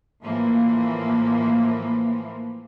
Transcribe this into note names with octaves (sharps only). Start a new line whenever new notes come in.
A2 E3 F3 A#3